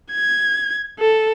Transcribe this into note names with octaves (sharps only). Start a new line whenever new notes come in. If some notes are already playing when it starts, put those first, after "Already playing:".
G#6
A4